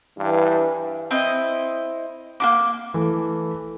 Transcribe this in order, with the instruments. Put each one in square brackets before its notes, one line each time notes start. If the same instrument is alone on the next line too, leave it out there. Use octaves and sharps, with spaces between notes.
[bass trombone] G2 [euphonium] E3
[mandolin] C4 E4 D#5
A#3 F4 D6
[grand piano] E3 A3